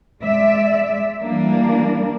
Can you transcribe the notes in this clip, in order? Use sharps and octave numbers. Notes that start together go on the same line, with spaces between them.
G#3 D5 E5
E3 G3 A#3 D4